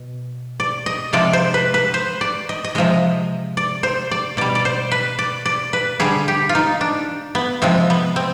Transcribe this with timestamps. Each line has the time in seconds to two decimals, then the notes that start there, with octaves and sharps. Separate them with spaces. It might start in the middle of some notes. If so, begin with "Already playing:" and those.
Already playing: B2
0.60 D5
0.86 D#5
1.13 C3 F3 G#3 D5
1.33 C5
1.54 B4
1.74 B4
1.94 C5
2.21 D5
2.49 D#5
2.64 D#5
2.75 C3 F3 G#3 D#5
3.57 D5
3.83 C5
4.11 D5
4.37 B2 G3 D5
4.55 D5
4.65 C5
4.91 B4
5.19 D5
5.46 D5
5.73 B4
6.00 D3 G3 G#4
6.28 G4
6.49 F4
6.55 D#4
6.81 D4
7.35 B3
7.62 C3 F3 G#3 C4
7.90 B3
8.16 C4